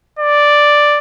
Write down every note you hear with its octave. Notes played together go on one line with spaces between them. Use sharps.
D5